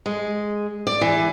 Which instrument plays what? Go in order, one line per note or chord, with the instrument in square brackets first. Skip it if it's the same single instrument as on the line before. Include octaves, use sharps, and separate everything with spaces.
[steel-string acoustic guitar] G#3
D5
E3